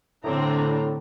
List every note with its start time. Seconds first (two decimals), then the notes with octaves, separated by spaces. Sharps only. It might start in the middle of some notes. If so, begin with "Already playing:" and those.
0.24 A2 D3 C4 D4 A#5